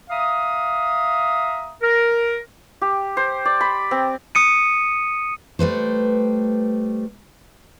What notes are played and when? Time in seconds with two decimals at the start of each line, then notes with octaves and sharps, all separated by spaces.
0.10 E5 F5 A#5 D#6
1.82 A#4
2.81 G4
3.17 C5
3.45 D5
3.61 B5
3.91 C4
4.35 D#6 C#7 D#7
5.59 G3 A3 B4 C5